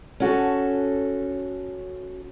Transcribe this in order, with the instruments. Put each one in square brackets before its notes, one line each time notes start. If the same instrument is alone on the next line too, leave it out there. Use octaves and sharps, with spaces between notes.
[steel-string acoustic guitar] C#4 F#4 A4